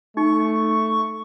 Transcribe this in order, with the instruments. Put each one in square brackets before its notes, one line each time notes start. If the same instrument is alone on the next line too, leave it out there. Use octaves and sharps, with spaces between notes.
[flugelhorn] A3 [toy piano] D#4 [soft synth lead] C#6